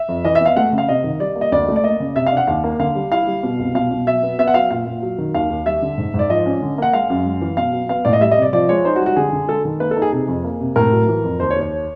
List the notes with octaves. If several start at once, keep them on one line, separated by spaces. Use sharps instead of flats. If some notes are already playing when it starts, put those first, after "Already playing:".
Already playing: E5
F2
E3 D#5
B3 E5
F5
A3 F#5
C#3
F5
C3 D#5
D#3
G3 D5
A#3
D#5
D2 D5
A3
D5
A#3 D#5
C#3
C3 E5
F5
D4
F#5
D#2 F5
A#3
D3 F5
G3
E4 F5
G3
B2
C2
B2 F5
B2
F#3 E5
B3
B3 E5
F#5
F#3 F5
A#2 F5
A#2
F#3
D#3
D#2 F5
D#2
G3 E5
D3
G#2
G#2
D5
F3 D#5
C#4
D3
A#3 F#5
G#3 F5
F#2
G#3
E3
B2 F5
F#3
B3 F5
A2 D5
D#5
G3 E5
D#5
C3 D5
F3 D5
G#3 C#5
D#4 C5
F#4
G3
F#4
D3 G#4
D3
G#3 A4
D#3
A#3 B4
A4
D#4
G#4
C3 G#4
F2
A#3
C3
A2 A#4
F#3
E3
F2
D#2 C5
C#5
D#2
C#5